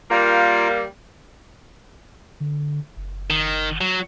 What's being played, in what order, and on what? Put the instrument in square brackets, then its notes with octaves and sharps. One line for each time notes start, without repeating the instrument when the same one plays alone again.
[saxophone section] G3 A#3 [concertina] F4 A#4
[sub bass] D3
F#1
[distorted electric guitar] D#3
F#3